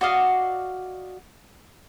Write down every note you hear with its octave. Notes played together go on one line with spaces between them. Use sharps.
F#4 D5 D#5 F5